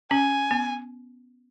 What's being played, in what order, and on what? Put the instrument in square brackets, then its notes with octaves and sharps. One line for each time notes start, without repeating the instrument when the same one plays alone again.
[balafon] C#4 [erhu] G#5
[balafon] B3